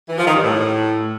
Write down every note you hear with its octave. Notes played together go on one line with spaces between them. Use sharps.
E3
F3
D#3
G2
A2